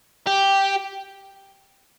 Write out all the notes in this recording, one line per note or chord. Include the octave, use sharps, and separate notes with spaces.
G4